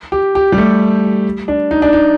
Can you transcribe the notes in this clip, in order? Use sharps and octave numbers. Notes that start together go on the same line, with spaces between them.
G4
G4
G3
A3
D4
D#4
D4
D#4